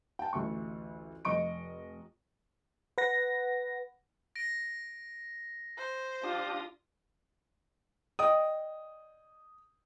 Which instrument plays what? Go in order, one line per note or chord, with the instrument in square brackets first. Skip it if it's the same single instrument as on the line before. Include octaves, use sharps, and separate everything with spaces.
[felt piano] G5 A5
A1 D2 E5 C#6
F1 D#5 C#6 D7
[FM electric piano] B4 F#5 A#6
[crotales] A#6 D7
[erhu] C5
[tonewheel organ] D4 G4 D#6 [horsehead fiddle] F4
[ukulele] D5 D#5 G5 [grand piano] D#6